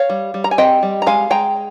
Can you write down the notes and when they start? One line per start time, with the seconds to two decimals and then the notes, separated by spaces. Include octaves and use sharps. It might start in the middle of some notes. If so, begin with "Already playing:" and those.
Already playing: C#5 F5
0.10 G3
0.34 G3
0.44 A#5
0.51 G#5
0.58 C4 D#5 G5
0.83 G3
1.02 A#5
1.06 G#3 F5 G#5
1.30 G#3 G5 A#5